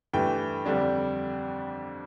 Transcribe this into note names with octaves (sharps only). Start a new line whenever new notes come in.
G2 E3 A3 G5
F2 D3 G3 D4